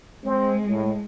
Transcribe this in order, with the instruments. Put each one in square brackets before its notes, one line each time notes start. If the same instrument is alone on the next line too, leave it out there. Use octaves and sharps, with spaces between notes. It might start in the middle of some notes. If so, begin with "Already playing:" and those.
[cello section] G#3 [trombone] C4
[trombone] A2